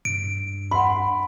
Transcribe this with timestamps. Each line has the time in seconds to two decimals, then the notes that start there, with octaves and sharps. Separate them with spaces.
0.05 G2 D7
0.71 F#5 B5 C6